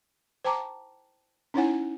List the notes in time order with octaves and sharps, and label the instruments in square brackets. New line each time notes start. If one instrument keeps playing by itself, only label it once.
[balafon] C5 G5 A5 A#5 D6
C#4 D#4 E4 C#5 F#5 G#5